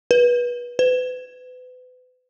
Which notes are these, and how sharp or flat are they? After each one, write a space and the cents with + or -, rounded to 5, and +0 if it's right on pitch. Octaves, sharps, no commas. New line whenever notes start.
B4 -25
B4 +35